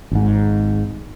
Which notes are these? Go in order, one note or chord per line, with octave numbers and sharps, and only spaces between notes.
G#1 G#2